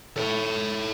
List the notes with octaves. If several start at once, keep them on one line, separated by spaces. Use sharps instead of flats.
A4 C#5